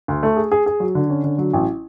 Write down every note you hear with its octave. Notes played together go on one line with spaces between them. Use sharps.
D2
A3
G#4
G#4
G#4
F#3
D3
C#4
D3
F#3
A1